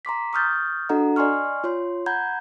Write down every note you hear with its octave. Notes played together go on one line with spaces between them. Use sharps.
A#5 C6 D6 B6
C#6 D#6 F6 G6 A6
D4 F#4 A4 D#5 F#5 A#5
D5 D#5 G#5 C6 C#6 F6
F4 C#5 C6
F#5 A#5 B5 G6 G#6